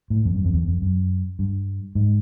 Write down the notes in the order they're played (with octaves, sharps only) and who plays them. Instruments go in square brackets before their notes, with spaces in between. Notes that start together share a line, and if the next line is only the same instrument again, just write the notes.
[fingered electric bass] A2
F2
F#2
F2
E2
F2
F#2
G2
G#2